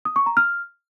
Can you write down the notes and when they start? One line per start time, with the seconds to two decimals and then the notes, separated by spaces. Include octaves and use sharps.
0.05 D#6
0.16 C#6
0.26 A#5
0.37 F6